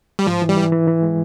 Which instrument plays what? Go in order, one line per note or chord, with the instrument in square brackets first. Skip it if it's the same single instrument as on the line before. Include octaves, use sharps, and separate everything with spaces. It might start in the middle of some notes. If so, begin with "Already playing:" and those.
[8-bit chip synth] G3
[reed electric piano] G#2 [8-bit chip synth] F3
[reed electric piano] E3
[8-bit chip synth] G3
[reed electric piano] E3
E3
E3
G#3